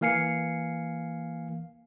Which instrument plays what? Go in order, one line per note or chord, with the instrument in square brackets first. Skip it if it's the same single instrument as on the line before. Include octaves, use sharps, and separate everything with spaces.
[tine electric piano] E3 A#3 F5 G#5 C7 C#7